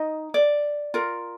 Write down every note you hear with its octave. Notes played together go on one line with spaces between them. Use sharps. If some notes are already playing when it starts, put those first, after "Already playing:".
Already playing: D#4 D#5
D5
F4 A#4